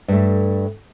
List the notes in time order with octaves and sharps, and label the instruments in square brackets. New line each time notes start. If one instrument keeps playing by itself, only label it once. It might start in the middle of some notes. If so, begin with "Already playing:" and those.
[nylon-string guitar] G2 A3